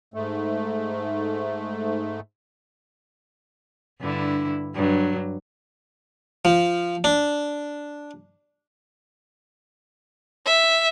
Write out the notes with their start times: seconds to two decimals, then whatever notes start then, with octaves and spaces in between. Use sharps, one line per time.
0.14 G#2 A3
4.00 G2 D3 E4
4.74 G2 F#3
6.45 F3
7.04 D4
10.46 E5